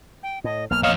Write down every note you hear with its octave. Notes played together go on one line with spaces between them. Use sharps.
G5
A2 D#5
B1 A#3 F6
F2 C#5 D#5 F5 F6